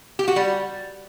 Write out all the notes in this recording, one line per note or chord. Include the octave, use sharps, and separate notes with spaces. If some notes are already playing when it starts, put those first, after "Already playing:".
G4
F#4
G3